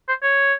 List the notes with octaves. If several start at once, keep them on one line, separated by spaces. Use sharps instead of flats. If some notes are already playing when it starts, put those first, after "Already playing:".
C5
C#5